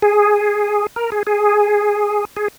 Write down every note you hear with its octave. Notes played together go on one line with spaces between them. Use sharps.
G#4
A#4
G#4
G#4
G#4